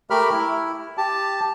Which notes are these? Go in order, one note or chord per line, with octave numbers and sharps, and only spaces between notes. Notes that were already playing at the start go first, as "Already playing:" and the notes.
A3 G4 A#4 B5 F6
E4
G4 A5